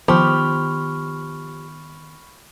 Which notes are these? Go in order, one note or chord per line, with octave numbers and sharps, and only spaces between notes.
D#3 F3 B3 G4 B5 C#6 F6